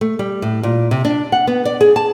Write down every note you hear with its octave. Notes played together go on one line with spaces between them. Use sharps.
A3
G3
A2
A#2
C3
D4
F#5
B3
D5
G#4
A5